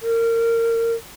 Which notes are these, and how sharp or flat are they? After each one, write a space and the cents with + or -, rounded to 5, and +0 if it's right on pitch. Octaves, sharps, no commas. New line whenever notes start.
A#4 -25